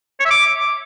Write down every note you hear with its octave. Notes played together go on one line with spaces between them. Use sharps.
C#5
E5
D6